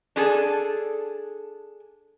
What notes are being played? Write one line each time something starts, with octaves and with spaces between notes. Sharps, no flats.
D4 G#4 A4